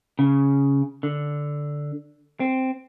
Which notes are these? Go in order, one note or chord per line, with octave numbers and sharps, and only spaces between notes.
C#3
D3
C4